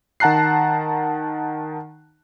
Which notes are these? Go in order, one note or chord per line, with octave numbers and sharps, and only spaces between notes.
D#3 F#5 A5 A#5 F#6 C7